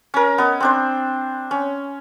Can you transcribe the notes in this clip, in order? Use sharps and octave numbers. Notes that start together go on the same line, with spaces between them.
C#4 A#4
B3 D#5
C4 D4 C5
C#4